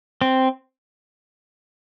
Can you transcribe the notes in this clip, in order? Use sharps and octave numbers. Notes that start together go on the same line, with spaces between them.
C4